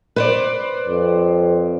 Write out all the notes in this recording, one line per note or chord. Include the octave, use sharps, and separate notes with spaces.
B4 C5 D5
F2